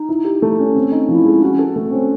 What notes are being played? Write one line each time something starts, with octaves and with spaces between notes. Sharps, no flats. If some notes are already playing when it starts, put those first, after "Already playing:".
Already playing: D#4
E4
G4
A3
C#4
C4
D#4
F3 E4
G#3
C#4 F#4
A4
A3
C4
C#4